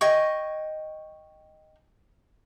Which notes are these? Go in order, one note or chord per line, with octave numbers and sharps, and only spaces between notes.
D#5 G5 G#5 C#6